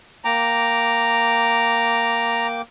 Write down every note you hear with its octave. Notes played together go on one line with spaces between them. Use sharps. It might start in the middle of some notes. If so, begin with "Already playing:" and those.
A#3 G5 A#5 D6